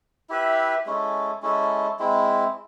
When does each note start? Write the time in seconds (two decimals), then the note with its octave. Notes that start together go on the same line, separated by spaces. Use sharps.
0.29 E4 G4 B4 E5
0.86 G#3 C#4 E4 A4
1.42 G#3 C#4 E4 A4
1.99 G#3 C4 E4